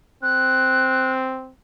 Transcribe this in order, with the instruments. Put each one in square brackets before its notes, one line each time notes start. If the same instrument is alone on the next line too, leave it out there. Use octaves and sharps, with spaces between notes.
[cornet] C4 [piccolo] F#6